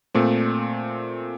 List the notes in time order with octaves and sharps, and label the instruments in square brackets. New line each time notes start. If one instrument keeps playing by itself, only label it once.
[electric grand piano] A#2 A3 C4